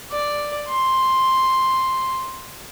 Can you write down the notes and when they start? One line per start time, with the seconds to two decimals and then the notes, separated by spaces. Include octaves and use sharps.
0.11 D5
0.68 C6